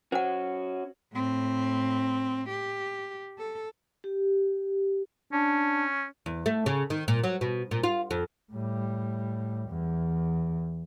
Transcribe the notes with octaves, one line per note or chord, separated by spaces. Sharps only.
C#4 F#4 C5 F#5
A2 C4
G4
A4
G4
C#4 D4
E2
A3
C#3
D#3
A#2
F#3
B2
A#2
F4
F2
A2 G3
E2